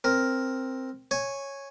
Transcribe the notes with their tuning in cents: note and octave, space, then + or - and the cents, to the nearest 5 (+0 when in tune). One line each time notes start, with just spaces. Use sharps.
C4 +5 A#4 +0
C#5 -5 G#5 +0